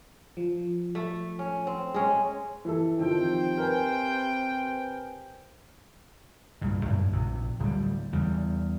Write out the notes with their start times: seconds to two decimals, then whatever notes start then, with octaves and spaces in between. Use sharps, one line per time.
0.37 F3
0.95 A3
1.39 C#4
1.67 C4
1.94 G#3 C#4
2.65 E3 A4
2.99 C3 D#3 F3 C5 G5
3.58 A#4 B4 G#5
6.61 C2 G2 A#2
6.85 F#2 A#2 A#3
7.12 A#1 C3
7.59 D1 G3
8.12 E2 C#3 G3